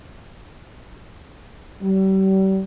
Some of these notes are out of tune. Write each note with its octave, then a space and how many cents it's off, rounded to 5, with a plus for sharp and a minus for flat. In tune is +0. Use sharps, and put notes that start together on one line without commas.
G3 -35